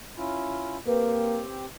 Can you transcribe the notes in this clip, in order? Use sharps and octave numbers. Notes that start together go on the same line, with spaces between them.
C#4 E4 F4
A#3 C4 G4 B4